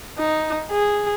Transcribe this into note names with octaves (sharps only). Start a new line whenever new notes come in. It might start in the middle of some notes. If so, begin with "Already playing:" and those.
D#4
G#4